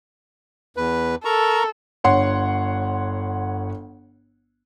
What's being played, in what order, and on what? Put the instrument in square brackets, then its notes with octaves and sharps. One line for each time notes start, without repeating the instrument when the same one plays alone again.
[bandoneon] E2 B4
[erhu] A4 [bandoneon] A#4 A#5 C#6
[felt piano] G1 C#5 F#5 C6